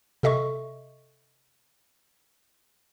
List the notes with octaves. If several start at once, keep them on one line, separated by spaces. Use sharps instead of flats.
C3 A4 D#5 E5 C#6